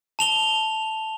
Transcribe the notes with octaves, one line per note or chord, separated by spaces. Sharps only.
A5 F7 G7